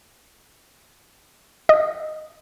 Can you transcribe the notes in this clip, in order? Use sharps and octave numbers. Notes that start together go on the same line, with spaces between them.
D#5